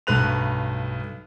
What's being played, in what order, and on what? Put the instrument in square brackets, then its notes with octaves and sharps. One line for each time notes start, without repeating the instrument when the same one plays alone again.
[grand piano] B1 G2 A3 B4 F#6 F7